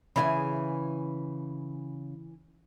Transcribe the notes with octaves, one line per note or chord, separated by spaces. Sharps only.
C#3 E3 E4 G#4 E5 G#5 B5